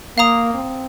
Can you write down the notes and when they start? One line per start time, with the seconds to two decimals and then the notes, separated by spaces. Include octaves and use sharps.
0.17 A#3 F5 A#5 D#6
0.53 C4